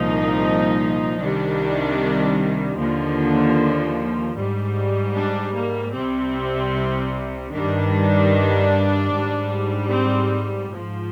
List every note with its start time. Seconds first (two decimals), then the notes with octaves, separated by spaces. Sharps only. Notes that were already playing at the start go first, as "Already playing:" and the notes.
Already playing: C2 A#2 F3 D#4
1.19 C2 C3 D#3 G3 D4
2.77 D#2 D3 F3
4.36 G#2 G3
5.16 D4
5.55 A#3
5.94 C2 C3 G3 C4
7.53 G2 D#3 G3 D4
9.12 G#2 G3
9.92 C4
10.70 G#2 F3